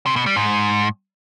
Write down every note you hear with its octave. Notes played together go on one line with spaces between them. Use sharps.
C3
B2
G3
G#2